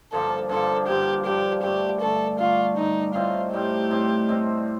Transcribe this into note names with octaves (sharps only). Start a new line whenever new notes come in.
G2 D3 F3 A#3 A4
G2 D3 F3 A#3 A4
G2 D3 F3 A#3 G4
G2 D3 F3 A#3 G4
G2 D3 A3 G4
G2 D3 A3 A4
G2 D3 A3 F4
G2 D3 A3 D#4
A2 G3 C4 D#4 F4
A2 G3 C4 D#4 G4
A2 G3 C4 D#4
A2 G3 C4 D#4